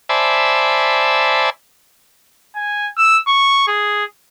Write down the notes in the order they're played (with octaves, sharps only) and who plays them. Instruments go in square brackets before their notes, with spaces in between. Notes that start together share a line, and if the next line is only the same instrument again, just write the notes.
[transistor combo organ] C5 D5 E5 G#5 A5 B5
[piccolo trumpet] G#5
E6
C#6
G#4